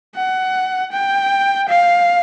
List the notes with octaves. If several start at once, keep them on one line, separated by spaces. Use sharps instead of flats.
F#5
G5
F5